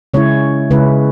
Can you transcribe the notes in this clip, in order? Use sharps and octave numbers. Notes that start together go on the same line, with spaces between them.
C#3 G#3 C#4 E4 C#5
C#3 G#3 C#4 E4 B4